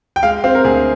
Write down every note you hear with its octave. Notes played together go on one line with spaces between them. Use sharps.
G5
G#3 F5
C4 F5
A#4
D2 G#4